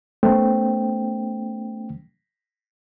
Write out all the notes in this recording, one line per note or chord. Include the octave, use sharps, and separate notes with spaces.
A3 B3 C#4 C5 G5